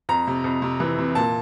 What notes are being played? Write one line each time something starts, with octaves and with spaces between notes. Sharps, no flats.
F2 A#5
C3
F2
C3
E3
C3
A#2 A5